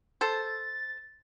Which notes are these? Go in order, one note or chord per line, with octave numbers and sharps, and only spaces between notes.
A4 C5 A6